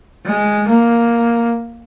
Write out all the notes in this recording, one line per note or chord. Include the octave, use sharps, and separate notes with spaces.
G#3
A#3